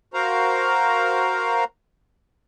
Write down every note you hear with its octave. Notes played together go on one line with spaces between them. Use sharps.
F#4 A#4 C5 F5 A#5